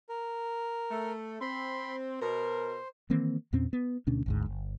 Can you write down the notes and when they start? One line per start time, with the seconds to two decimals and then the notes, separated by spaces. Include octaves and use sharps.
0.09 A#4
0.91 A3
1.41 C4 B5 C6
2.21 B2 A#4 C5
3.10 D#3 E3 A#3 C4
3.53 E2 A#2 C4 C#4
3.73 B3
4.07 D2 B2 C#4 D4
4.26 G#1 D2 G#2
4.46 G1